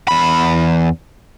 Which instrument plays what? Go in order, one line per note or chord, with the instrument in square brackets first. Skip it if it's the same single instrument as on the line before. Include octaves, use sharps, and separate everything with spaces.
[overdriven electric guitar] E2 B5